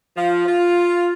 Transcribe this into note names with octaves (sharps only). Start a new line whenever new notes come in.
F3
F4